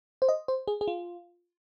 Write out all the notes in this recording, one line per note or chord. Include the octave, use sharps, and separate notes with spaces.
C5
D#5
C5
G#4
G#4
F4